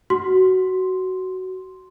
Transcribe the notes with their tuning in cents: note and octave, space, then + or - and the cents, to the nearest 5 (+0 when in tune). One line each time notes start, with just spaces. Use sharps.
F#4 +15 C6 +0